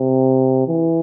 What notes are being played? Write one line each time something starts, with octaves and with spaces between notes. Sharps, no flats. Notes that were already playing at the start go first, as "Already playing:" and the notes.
Already playing: C3
E3